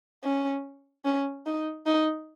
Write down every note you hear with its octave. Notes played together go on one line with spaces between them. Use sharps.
C#4
C#4
D#4
D#4